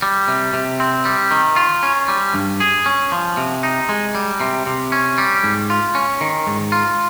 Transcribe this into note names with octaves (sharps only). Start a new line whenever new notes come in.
G3
C3
C3
C4
G3
D#3
F4
C#4
G3
G2
G#4
C#4
F3
C3
D#4
G#3
G3
C3
C3
C#4
G3
G#2
F4
C#4
D#3
G#2
F4